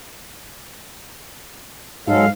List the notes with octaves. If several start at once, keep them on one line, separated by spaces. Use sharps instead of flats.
G#2 F#3 G#3 A4 F5